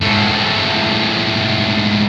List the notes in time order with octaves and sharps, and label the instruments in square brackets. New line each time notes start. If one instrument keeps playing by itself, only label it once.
[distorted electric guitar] G#2 A3